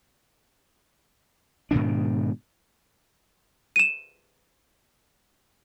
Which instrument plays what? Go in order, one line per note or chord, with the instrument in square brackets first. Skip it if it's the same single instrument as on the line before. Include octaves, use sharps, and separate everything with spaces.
[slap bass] G#2 B2 D#3 D4
[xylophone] D#7 E7